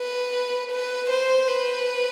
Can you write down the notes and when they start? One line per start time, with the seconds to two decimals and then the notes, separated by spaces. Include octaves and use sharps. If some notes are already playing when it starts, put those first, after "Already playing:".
Already playing: B4
0.71 B4
1.10 C5
1.48 B4